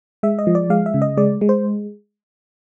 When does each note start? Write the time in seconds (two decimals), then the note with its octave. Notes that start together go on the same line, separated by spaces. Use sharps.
0.23 G#3 E5
0.39 D#5
0.47 F3
0.55 D5
0.70 G#3 F5
0.86 E5
0.94 C#3
1.02 D#5
1.17 G#3 D5
1.41 G#3
1.49 C5